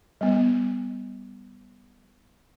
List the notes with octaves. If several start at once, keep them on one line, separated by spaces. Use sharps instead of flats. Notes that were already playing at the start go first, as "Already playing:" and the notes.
G3 B3